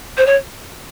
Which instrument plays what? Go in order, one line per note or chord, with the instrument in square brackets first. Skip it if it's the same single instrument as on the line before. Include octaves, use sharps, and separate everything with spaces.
[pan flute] C5
C#5